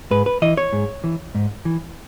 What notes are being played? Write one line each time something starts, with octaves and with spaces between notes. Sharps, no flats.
G#2 B4
B4
E3 D#5
C#5
G#2
E3
G#2
E3